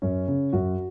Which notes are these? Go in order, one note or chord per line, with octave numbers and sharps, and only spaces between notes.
F#2 C#4
C#3
F#2 F#4